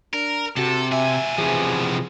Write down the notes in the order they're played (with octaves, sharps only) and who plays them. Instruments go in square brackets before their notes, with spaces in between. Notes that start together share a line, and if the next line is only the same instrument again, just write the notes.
[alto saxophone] D4 [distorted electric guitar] A#4
[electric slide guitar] C3 [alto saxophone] F#4 [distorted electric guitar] A4
[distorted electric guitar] B2 G#5 [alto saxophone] E5
[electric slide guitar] C3 E3 F3 [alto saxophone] G#4